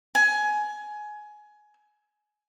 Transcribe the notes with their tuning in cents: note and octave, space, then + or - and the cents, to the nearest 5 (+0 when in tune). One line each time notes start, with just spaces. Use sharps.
G#5 +20